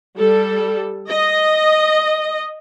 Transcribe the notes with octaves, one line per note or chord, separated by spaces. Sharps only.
G3 A4
D#5